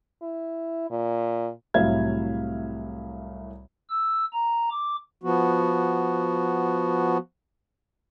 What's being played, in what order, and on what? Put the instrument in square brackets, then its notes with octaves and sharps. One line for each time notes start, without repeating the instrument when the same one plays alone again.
[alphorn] E4
A#2
[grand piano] C2 A2 F#3 E5 F5 G#6
[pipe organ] E6
A#5
D6
[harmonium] F3 B3 F#4